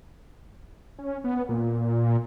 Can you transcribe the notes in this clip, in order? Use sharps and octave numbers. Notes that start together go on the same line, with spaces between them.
C#4
B3
A#2